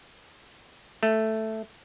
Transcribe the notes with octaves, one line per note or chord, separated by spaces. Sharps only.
A3